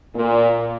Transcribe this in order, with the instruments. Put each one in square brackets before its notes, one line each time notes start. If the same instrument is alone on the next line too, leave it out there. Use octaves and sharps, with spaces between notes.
[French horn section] A#2